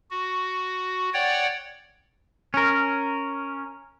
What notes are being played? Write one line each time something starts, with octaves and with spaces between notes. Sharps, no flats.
F#4
C#5 D5 F#5 G5
C#4 A#4